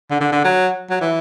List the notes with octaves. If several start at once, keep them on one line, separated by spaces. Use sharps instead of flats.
D3
D3
D3
F#3
F#3
E3